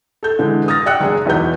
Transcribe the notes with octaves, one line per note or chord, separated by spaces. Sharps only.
A4 G6
D3 E3 G#3
D#6 F6 A6 A#6
D5 F#5 G5 E6 F#6 C#7
F#1 G#4
B1 E2 B4 G6